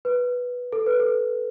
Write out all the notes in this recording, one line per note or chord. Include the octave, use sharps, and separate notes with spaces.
B4
A4
B4
A4